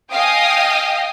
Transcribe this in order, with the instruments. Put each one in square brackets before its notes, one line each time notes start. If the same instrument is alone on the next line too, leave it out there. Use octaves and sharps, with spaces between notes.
[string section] D#5 F5 G5 G#5 D#6